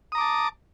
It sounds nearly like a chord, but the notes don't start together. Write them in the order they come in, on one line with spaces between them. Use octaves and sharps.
D#6 A#5 D6 A5